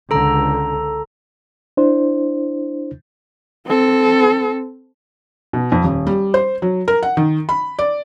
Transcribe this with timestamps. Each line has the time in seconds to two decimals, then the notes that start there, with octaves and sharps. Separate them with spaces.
0.11 C#2 D3 A4 A#5
1.77 D4 E4 C5
3.66 C4 A4
5.53 B2
5.72 F2
5.84 D#1
6.07 G3
6.34 C5
6.62 F#3
6.88 A#4
7.03 F#5
7.17 D#3
7.49 B5
7.79 D5